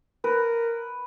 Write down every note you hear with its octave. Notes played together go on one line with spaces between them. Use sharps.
A#4 B4